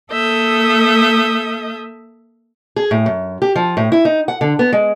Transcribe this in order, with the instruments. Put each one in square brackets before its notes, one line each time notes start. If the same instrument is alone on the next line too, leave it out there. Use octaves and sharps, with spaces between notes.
[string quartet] A#3 A4 E5 D#6 G6
[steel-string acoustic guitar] G#4
A2
F#2
G4
F3
A2
E4
D#4
F#5
D3
B3
G#3